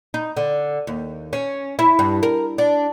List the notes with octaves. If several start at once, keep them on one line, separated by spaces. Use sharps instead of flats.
D#4
D3
D#2
C#4
E4
G2
A#4
D4